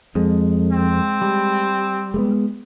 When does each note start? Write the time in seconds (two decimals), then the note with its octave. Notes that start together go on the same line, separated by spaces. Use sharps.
0.15 F2 G#3
0.72 C4
1.22 G3
2.14 G#3 A3 B3